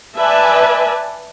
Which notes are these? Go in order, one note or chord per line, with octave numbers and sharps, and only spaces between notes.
B4 D5 E5 G#5 A5